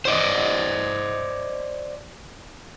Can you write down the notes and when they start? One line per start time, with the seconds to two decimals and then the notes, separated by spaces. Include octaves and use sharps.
0.05 C5 D5 D#5